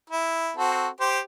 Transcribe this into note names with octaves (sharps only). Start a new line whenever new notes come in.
E4
C4 F#4 A4
G4 C5